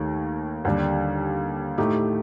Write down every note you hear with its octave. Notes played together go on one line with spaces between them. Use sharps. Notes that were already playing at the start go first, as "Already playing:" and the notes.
Already playing: D#2 D#3 A3
D#2 D3 G3
A2 A3 D#4 G4